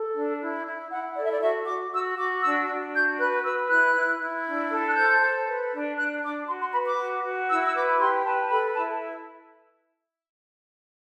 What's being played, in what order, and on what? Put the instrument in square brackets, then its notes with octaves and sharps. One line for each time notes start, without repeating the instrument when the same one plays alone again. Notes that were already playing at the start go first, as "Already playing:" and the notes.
Already playing: [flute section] A4
D4
E4
E4
E4 F#5
A4 D5
E5
D5
F#4 E5
F#4 D6
F#4 E6
F#4 D6
D4 E6
D4
F#4 G6
B4 F#6
B4 E6
E4 F#6
E4
E4
D4
A4
F#6
C5 G6
A4
B4
D4
D4 F#6
D4 D6
F#4 C6
C6
B4 B5
D6
F#4
F#4
E4 E6
E6
B4 D6
G4 C6
B4 A5
A4 B5
E4 A5